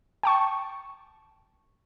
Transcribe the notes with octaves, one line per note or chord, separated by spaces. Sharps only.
G5 A5 C#6